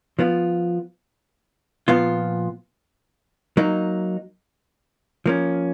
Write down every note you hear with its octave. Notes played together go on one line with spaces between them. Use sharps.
F3 B3 F4
A#2 F3 B3 F4
F#3 A#3 D#4
F3 A#3 C#4